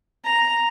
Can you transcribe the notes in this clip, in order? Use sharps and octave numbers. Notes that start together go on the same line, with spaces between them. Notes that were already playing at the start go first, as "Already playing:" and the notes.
A#5